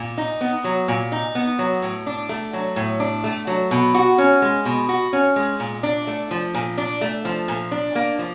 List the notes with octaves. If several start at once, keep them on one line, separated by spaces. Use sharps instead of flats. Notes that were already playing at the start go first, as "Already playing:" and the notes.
Already playing: A#2
D#4
B3
F#3
A#2
D#4
B3
F#3
A2
D4
A3
F#3
A2
D4
A3
F#3
B2
F#4
C#4
G#3
B2
F#4
C#4
G#3
A#2
D4
A3
F3
A#2
D4
A3
F3
A#2
D4
A#3
F3